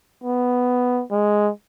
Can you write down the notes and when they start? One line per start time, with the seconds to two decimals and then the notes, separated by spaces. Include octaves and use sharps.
0.23 B3
1.11 G#3